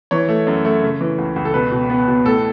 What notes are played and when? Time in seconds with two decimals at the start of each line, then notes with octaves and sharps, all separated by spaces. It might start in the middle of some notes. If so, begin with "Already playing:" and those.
0.11 E3 C#5
0.28 A3
0.47 F#2
0.65 A3
0.82 C#3
1.01 E3
1.18 C#2
1.36 C#2
1.45 A4
1.54 B2 B4
1.71 B2
1.90 B3
2.08 B2
2.25 A2 A4